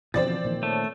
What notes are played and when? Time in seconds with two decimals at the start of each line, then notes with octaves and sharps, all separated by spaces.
0.14 B2 D3 E3 F3 C4 D5 A6
0.44 A#2 D#3
0.63 A3 C#5 A5